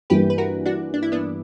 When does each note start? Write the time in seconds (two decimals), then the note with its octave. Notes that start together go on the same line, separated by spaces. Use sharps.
0.10 G2 E3 G3 A#3 G4 B4
0.30 B4
0.38 F#4 A#4
0.66 D4 F#4
0.94 D4
1.03 E4
1.12 B3 D4